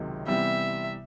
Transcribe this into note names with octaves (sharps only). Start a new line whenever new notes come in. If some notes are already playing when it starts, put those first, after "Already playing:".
Already playing: C#2 C3 D#3 F#3
C3 E3 G3 B3 E5